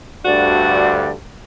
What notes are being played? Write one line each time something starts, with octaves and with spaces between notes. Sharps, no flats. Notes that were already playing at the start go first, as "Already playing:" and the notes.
D2 G2 D3 F#4 D5